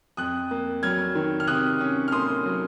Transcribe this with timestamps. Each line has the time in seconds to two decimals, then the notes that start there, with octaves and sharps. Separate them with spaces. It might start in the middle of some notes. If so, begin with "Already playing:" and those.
0.17 F2 D#6 F#6
0.51 A#3
0.83 F#3 F6 G#6
1.15 D#3
1.40 F6
1.48 C3 D#6 F#6
1.81 C#4
2.08 F6
2.12 A#3 C6 D#6
2.45 F#3